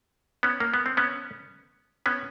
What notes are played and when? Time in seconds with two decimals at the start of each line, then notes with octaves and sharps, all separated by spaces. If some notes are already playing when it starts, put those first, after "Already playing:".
0.43 B3 C#4
0.60 A#3
0.74 B3
0.86 C4
0.97 B3 C#4
2.06 B3 C#4